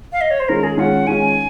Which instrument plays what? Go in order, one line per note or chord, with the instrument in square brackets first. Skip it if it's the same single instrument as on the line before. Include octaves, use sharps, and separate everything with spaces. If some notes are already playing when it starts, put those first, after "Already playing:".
[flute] F5
D#5
C#5
C5
[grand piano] D#3 G#3 C#4 F4 [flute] A#4
[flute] G#4
[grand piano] D#3 G#3 C#4 F4 [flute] F#5
[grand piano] D#3 G#3 C#4 F4 [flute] G#5